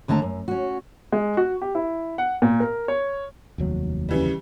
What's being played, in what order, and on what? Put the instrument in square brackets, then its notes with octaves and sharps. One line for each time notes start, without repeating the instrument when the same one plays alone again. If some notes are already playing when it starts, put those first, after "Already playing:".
[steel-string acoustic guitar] D#2 D3 A3 A5 A#5
F#2
C#4 F#4
[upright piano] G#3
F#4
G4
E4
F#5
A#2
A#4
C#5
[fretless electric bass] F1 D#2 F#3
[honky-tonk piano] C#3 E3 G3